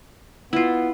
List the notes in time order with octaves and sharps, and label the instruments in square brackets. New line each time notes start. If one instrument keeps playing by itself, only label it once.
[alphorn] B3 [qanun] E4 F4